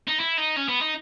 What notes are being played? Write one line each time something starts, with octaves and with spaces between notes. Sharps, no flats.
D#4
E4
D#4
C#4
B3
D#4